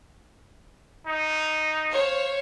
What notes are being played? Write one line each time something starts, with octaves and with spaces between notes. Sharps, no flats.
D#4
C5 C#5 F5